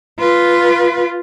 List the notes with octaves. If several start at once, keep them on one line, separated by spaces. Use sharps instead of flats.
F4 B4